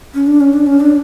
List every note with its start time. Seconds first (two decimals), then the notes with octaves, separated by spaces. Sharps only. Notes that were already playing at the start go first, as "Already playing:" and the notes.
0.14 C#4
0.27 D4
0.40 C#4
0.53 D4
0.66 C#4
0.80 D4